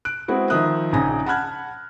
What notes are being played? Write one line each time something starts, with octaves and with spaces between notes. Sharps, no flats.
F#6 D7
G#3 B3 C4 E4 F#4
D#3 F3 D#5 E5 D#6 F#6
A#1 C#3 D#4 G#5 A#6
F#5 A5 B5 F6 F#6 G#6